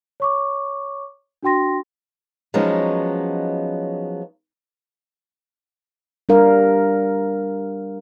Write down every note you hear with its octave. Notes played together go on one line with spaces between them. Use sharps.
C#5 C#6 D6
D4 F#4 G5 C6 A#6
F3 F#3 G#3 B3 C#4 D#4
G3 D4 A#4 F5